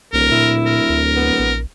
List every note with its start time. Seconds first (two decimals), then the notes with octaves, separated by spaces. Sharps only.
0.13 D1 C2 A#4
0.31 A#2 E4
0.66 A#4
0.90 D2
1.16 B3
1.39 A#1